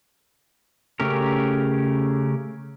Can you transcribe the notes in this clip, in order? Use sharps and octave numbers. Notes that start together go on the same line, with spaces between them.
C#3 A3 C#4 G4 A#4